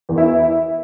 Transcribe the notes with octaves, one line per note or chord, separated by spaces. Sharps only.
E2
E4